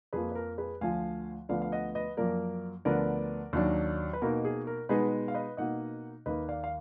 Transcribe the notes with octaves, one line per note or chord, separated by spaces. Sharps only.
F2 F3 A#3 G#4 B4
B4
A#4
G#4 B4
D2 D3 F3 F5 G#5
D2 D3 F3 B3 D5 F5
F5
D#5 F#5
B4 D#5
F#2 F3 A#3 A#4 D5
D2 D3 F3 B3 D4 A#4 D5
D#2 D#3 F#3 D4
B4
B2 A#3 D#4 A#4
G#4
A#4
B2 G#3 B3 D#4 G#4 B4
F5
B4 D#5
B2 A#3 D#4 D#5 F#5
D#2 D#3 A#3 B4 D#5
D5 F5
F5